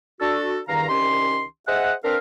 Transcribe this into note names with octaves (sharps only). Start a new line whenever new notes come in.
D4 F#4 A4
E2 G2 D#3 F5 A#5
C2 D#3 C#4 G4 C6
G#4 C5 D#5 E5 F#5
C4 D4 A#4 B4 F5